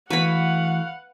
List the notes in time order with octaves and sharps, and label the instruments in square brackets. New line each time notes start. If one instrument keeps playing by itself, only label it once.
[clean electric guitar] E3 A3 F#4 [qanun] B4 B5 [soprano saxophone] F5 [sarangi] F#5